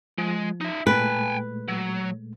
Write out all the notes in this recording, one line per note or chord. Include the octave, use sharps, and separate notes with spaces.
F3 G#3
D#4 E5
A#2 G#3 A3 B4 G5 G#5
F#3